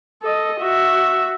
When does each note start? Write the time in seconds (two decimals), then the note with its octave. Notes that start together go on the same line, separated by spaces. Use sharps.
0.23 A4 D#5
0.61 F#4 E5